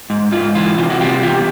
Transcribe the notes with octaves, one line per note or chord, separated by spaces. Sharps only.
G#2
G#2 F4
E3 F4
C3 F4
F#4
G3 F4 G4
E2 F4 G4